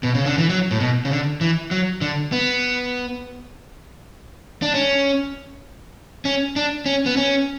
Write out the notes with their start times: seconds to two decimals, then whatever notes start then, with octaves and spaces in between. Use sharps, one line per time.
0.03 B2
0.15 C#3
0.26 D3
0.38 E3
0.49 F#3
0.71 A2
0.80 B2
1.05 C#3
1.11 D3
1.41 E3
1.71 F#3
2.01 D3
2.32 B3
4.62 D4
4.75 C#4
6.25 C#4
6.56 D4
6.86 C#4
7.06 B3
7.17 C#4